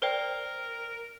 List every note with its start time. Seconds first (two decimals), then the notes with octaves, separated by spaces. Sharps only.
0.02 A#4 C5 D5 G5